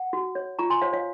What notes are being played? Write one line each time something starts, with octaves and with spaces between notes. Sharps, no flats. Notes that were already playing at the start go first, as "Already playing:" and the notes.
Already playing: F#5
F#4
C#5
F4 A#5 C#6
G#5 C6
C5 C#5 F5
C#5 F5